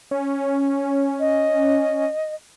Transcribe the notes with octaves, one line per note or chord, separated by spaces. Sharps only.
C#4
D#5